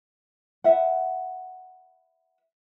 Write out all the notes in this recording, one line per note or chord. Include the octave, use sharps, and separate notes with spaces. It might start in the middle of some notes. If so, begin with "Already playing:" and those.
B4 E5 F#5